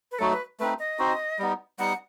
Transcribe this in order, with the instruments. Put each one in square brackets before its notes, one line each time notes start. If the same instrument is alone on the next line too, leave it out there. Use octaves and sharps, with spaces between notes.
[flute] B4
[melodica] F#3 A3 D#4 F#4 [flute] A4
[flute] B4
[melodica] A3 C4 D#4 [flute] B4
[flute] D#5
[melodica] C4 D#4 F#4 C5
G3 B3 D#4
[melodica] G3 B3 D#4 [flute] F#5